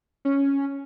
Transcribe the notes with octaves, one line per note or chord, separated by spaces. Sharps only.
C#4